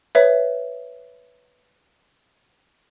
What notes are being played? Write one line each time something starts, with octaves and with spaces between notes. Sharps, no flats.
B4 C#5 E5